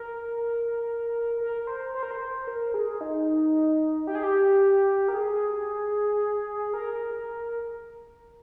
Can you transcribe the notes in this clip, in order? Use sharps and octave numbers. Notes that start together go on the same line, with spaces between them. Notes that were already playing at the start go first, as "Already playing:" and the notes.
Already playing: A#4
A#4
C5
C5
A#4
C5
A#4
G#4
D#4
G4
G#4
G4
A#4
G#4
A#4